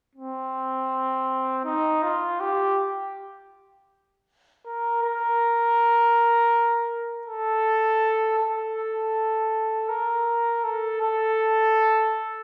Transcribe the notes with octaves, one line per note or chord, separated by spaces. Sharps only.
C4
D#4
F4
G4
A#4
A#4
A4
A4
A#4
A4
A4